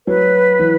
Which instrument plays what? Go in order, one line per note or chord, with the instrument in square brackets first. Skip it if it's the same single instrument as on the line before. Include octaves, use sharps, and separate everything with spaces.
[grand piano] F#3 [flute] B4
[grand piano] E3